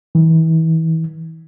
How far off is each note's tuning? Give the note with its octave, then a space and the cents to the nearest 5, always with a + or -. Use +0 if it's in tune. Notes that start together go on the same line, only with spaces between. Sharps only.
E3 -35